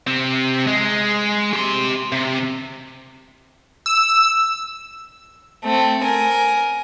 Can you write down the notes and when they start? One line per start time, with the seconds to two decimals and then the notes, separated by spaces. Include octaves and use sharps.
0.07 C3 C4
0.67 G#3
1.53 G4 C6
2.12 C3
3.86 E6
5.64 A3 C4
6.04 A#4 G#5